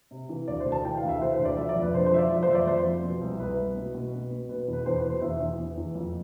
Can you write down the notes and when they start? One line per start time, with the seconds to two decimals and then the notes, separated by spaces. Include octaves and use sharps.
0.11 C3
0.29 E3
0.48 D2 D5
0.60 C5
0.66 D2
0.72 A5
0.85 E3 G5
0.97 F5
1.03 D2
1.09 E5
1.21 E3 C5
1.34 C5
1.39 D2
1.45 D5
1.57 F3 E5
1.69 D5
1.76 F2
1.82 B4
1.94 D3 C5
2.06 C5
2.12 F3 E5
2.18 D5
2.30 F3
2.43 C5
2.49 F2 E5
2.55 D5
2.67 F2 C5
2.85 F3
3.03 B2
3.21 C2
3.39 C2 B4
3.58 C2
3.77 B2
3.95 B2
4.13 B2
4.31 B2
4.49 B2 B4
4.68 E2
4.73 B4
4.86 E2 C5
4.98 B4
5.05 B2
5.10 C5
5.22 E2 E5
5.40 E2
5.58 E2
5.77 E2
5.95 F2